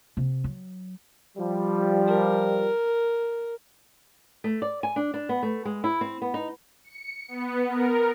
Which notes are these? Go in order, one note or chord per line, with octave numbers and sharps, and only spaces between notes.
C3
F#3
F3 G3
A#4
A3
D5
G#5
D4
D4
B3
A3
G#3
E4
C4
B3
D#4
C#7
B3
A#4